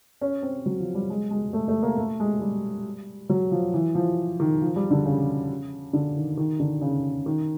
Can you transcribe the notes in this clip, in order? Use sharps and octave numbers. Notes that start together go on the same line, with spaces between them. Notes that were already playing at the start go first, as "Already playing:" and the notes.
C#4
C4
F#3
F3
G3
G#3
G#3
A3
A3
A#3
A3
G#3
G3
F#3
F3
E3
F3
D#3
F3
G3
D3
C#3
D3
D#3
D#3
D3
C#3
D#3